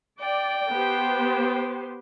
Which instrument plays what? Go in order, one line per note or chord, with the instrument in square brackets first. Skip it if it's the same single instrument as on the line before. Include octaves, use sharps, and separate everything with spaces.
[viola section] D5 [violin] G5
[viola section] B3 G4 C5